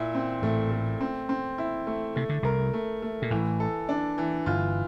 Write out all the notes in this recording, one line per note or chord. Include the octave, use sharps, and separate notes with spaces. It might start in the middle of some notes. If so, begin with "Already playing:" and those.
Already playing: A#2 E4
C4
A1 A2 A3
A3
C4
C4
E4
A3
C3 A3
D3
C2 C3 A#4
A3
A3
A#2
A1 A2 E3
A4
D4
E3
G1 G2 F4